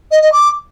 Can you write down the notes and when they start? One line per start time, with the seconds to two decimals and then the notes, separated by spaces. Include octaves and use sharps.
0.11 D#5
0.22 D#5
0.32 D6